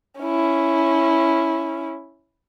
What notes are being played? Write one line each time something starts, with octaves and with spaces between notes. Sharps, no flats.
C#4 E4